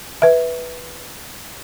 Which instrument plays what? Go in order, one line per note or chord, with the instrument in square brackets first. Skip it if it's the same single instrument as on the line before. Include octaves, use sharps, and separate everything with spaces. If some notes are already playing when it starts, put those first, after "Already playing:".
[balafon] B4 E5